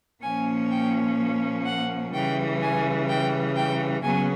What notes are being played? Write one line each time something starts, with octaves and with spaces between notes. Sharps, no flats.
A#2 F3 A#3 C#4 G#5
G5
F#5
C#3 E3 G3 G5
G#5
G5
G5
C#3 F#3 B3 G#5